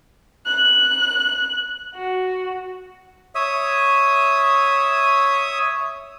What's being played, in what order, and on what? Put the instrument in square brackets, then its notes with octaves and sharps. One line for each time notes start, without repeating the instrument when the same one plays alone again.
[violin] F#6
F#4
[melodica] C#5 E5 D#6